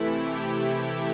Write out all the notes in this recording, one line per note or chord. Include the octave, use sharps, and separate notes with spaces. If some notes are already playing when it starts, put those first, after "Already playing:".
Already playing: C3 E3 A3 E4
G4